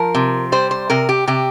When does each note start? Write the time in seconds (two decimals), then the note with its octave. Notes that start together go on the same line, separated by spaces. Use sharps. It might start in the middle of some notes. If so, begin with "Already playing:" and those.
Already playing: F3 A#4
0.15 C3
0.52 G3 C5
0.71 C5
0.90 C3 A#4
1.09 G4
1.28 C3 G4